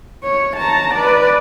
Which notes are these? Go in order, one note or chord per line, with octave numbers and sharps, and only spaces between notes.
C#5
A5 A#5
B4 D5